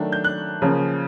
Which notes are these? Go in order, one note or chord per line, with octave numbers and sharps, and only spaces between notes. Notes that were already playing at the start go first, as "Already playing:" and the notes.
Already playing: D#3 F#3 A3 D4
G6
F#6
C#3 F3 A#3 C#4